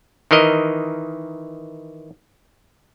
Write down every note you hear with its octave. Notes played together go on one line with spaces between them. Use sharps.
D#3 E3 A#4 D#5